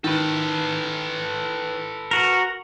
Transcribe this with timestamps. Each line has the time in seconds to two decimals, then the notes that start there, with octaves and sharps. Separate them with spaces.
0.04 D#3 A4 B4
2.11 F#4 A#4